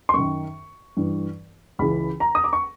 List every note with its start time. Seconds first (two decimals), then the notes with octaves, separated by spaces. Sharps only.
0.09 C6
0.14 F#2 D#3 C#6
0.97 G2 E3
1.79 C#2 C#3 E3 B5
2.20 A#5
2.35 D#6
2.44 D6
2.53 C#6